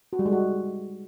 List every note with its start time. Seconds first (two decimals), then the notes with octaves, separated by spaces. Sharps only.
0.13 F#4
0.19 G3
0.26 G#3
0.32 F#4